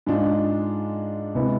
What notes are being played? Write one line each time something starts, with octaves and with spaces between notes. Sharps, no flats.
G#2 G#3 D4 F4
C3 G#3 B3 E4